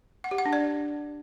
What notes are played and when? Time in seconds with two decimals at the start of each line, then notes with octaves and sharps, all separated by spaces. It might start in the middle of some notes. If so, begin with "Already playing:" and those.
0.24 F#5
0.31 G4
0.38 F#5
0.46 D4
0.53 D5